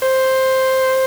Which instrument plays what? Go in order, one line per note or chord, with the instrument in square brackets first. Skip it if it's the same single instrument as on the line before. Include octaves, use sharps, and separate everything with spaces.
[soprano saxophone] C5